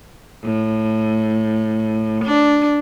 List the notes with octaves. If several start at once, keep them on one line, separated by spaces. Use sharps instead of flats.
A2
D4